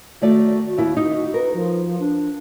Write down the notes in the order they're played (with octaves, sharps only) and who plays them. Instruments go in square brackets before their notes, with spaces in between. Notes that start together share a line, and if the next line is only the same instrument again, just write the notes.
[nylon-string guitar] D#3 A3 D5 [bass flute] F#4
[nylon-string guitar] D#2 E4 [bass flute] F#4
[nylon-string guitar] D#4
[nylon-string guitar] A#4 [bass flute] B4
[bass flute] F3
D4